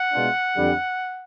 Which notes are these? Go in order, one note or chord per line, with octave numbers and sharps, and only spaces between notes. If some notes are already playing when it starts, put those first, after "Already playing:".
Already playing: F#5
B2 G#3 B3 D4 F4
F2 D3 G3